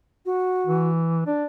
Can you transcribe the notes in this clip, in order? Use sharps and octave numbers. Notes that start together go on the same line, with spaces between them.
F#4
E3
D4 D5